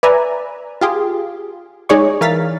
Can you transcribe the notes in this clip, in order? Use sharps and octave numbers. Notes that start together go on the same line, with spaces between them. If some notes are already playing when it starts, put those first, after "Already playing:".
B4 D5 E5 G#5 A#5
F4 G4 G#4
G#3 D#4 G#4 C#5 D5 C#6
E3 A#4 F5 F6 A6 B6